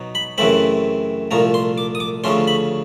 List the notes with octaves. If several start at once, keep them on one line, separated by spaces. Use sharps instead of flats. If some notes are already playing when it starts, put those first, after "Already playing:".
Already playing: B2 F#3 D#4
B5
F#2 C#3 E3 A3 C4 B5
C2 A#2 F3 A3 A#5
C6
D6
D#6
D6
D2 C#3 F3 A3 C#4 C6
B5